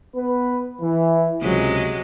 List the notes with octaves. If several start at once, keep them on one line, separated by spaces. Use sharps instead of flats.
B3 B4
E3
C#2 C3 F#3 G#3